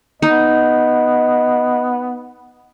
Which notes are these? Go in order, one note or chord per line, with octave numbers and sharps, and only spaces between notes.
B3 D#4 D#5